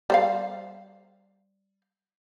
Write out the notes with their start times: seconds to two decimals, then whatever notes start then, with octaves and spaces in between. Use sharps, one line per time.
0.10 G3 C5 F5